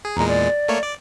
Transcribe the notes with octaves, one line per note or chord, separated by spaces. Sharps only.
G#4
E2 A#2 G#3 A#5
D5
A3 A#3 C#5
D5